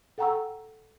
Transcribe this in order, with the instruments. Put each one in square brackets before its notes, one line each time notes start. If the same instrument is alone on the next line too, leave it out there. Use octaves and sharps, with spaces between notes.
[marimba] A4 F#5 G5 A#5 C#6 E6